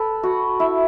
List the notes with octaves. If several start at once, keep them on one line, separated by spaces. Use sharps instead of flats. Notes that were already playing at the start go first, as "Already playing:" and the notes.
Already playing: A4 B4
F#4
E4